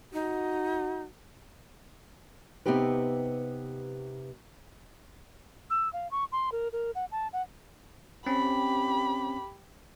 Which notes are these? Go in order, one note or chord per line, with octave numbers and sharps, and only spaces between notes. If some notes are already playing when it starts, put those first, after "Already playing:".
D#4 F#4
C3 B3 C4 D#4 G4 B4
E6
F5
C#6
C6
A#4
A#4
F#5
A5
F#5
C4 C#4 G4 B5